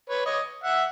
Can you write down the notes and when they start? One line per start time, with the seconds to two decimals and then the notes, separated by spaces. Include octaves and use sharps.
0.09 B4 C#5
0.25 C#5 D#5
0.64 E5 F#5